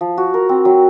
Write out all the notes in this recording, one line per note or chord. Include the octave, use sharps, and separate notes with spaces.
F3
F#4
A#4
C4
F#3